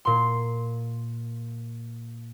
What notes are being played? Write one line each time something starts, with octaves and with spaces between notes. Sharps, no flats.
A#2 C6